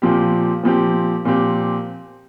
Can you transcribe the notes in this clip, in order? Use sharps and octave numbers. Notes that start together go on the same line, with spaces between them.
A#2 F3 C4 G4
A#2 F3 C4 G4
A#2 F3 C4 G4